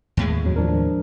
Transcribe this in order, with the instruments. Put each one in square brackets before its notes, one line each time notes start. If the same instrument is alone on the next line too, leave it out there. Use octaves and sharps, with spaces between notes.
[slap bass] D#2 A2 G#3
[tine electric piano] F2 F#3
F3 D4 A#4